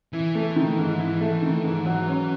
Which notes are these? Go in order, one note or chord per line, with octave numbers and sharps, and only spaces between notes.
E3 E4
A3
D#3
G#2
E4
A3
D#3
G#2
F#3
C#4